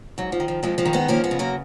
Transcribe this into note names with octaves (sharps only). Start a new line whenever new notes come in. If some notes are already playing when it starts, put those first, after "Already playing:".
G#2 F#3
F3
D#3
F3
F2 F3 G#3
F3 G#3
D#3
G#3 B3
F3 A#3 C#4
G#3 B3
C#3
F#3 A#3